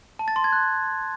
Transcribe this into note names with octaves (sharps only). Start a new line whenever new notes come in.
A5
A6
C6
G#6
F#6